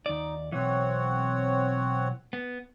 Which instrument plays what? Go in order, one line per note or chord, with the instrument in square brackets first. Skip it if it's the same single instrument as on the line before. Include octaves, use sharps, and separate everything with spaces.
[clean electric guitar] D#2 D5 [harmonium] D#4
[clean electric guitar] B1 E3 [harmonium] C4 C#5 F#5
[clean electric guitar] B3